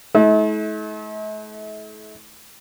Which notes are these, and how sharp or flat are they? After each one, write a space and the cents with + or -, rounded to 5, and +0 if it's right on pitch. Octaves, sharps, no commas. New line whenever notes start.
A3 -45 E4 -45